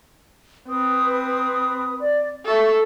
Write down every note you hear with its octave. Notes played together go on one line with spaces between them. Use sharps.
C4 B4 D#6
D5
A4 E5 C#6